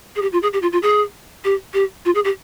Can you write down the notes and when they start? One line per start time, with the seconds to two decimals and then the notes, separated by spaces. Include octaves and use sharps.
0.16 G#4
0.22 G4
0.33 F4
0.42 G#4
0.53 G4
0.62 F4
0.73 F4
0.83 G#4
1.44 G4
1.74 G4
2.05 F4
2.15 G#4
2.24 G4